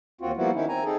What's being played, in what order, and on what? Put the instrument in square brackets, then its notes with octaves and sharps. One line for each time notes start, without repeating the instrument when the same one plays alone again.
[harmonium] D#2 C4 F4 F#4
F3 G3 A#3 B3 E4 F#4
D#3 C#4 D#4 E4
C4 G#5 A#5
C4 D#4 G#4 A4